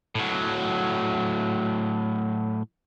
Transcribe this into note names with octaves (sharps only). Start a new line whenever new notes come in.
A2 F#3